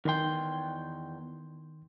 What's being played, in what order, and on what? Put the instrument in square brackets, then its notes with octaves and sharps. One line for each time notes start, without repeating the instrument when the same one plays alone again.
[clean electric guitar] E2 G5 [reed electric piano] D#3 C6